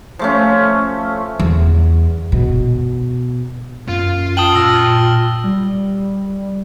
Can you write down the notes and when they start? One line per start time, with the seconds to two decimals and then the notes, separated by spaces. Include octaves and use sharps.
0.19 F3 A3 C#4
1.40 E2
2.32 B2
3.88 F#2 F4
4.37 G5 A5 D#6 F#7 G7
4.55 A#2 E6 F6 A#6
5.44 G3